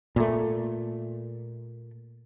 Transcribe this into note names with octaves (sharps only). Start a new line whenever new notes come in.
A#2 A3